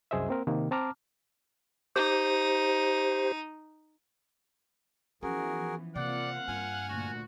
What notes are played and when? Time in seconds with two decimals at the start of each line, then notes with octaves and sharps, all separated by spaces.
0.11 C2 F#2 G#4 C5 D#5 E5
0.29 A#3 C4 A#4
0.47 C3 D#3 A#3
0.71 C4 A5 A#5 D6 F6
1.96 D#4 G4 C5
5.23 E3 F3 B3 C#4 F#4 G#4 A#4
5.96 C3 A#3 C4 F4 D5 F5 F#5
6.48 G2 G#5 F6
6.89 D2 A#2 F#4